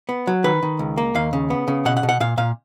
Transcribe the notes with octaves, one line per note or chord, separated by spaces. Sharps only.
B3
F#3
D#3 B4
D#3
C#2
A#3
D#2 F5
C#3
B3
C#3
B2 F#5
F#5
B2
F#5
A#2 F5
A#2 F5